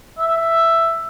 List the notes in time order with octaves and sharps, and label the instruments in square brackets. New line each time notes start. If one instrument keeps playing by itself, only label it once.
[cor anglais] E5